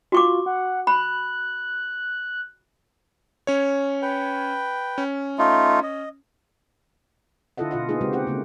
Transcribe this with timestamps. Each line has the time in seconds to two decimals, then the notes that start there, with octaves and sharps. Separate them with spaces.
0.12 F4 F#4 C#6 D6
0.46 F#5
0.87 B5 F#6
3.47 C#4 C#5
4.02 B4 G5
4.98 C#4
5.38 A3 D#4 F4
5.83 D#5
7.57 D3 E4 F4 A4 D#5 F#5
7.71 B2 F4 D#5 F#5
7.89 A#3 B3 D#4 F4 G#4
8.01 C#3 G#3 C4 F#4 G4
8.13 C4 G4 F#5
8.27 C#3 A3 A#3